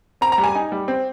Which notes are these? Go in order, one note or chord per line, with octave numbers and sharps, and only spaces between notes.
C4 A#5
A#5
G3
G#5
D#4
G3
C4